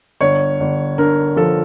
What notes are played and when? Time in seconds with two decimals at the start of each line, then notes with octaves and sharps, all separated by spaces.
0.21 G1 C#5
0.60 G1
0.98 D3 A#4
1.36 F3 A4